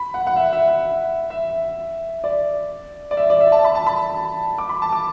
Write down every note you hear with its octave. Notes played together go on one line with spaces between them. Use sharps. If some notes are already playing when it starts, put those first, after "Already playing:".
Already playing: B5
F#5
F#5
E5
E5
E5
E5
D5
D5
E5
D5
E5
A5
B5
A5
B5
D6
B5
A5
D6